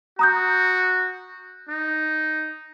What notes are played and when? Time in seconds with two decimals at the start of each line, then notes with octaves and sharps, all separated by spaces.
0.19 F#4 A#5 D#6 G6
1.69 D#4